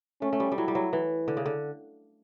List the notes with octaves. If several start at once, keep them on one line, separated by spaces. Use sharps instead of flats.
A3 C#4
A3
G3
G3
F#3 E4
G3
F#3
E3
D3
C#3
D3